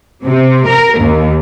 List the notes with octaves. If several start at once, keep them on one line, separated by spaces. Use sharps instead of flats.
C3
A#4
D#2